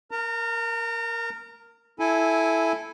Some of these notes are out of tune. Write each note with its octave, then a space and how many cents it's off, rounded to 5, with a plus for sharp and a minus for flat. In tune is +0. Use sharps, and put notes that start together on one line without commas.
A#4 +0 A#5 -35
E4 +0 A4 -15 G#5 +0